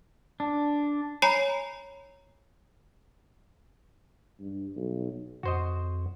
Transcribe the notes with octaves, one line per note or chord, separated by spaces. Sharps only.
D4
C#5 G#5 A#5 B5 C7
G2
B1
F2 F#4 C5 D#5